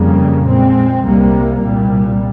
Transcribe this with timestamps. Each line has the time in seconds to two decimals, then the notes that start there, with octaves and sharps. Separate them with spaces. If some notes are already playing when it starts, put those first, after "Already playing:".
Already playing: F2 C#3 G3 A#3
0.46 A#2 G#3 C4
1.04 C2 C3 G3 A#3
1.62 C2 A#2 G3